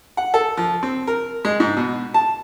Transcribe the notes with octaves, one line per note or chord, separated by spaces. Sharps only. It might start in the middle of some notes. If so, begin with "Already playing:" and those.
F#5
A4
F3
C4
A#4
G#3
G#2
B2
A5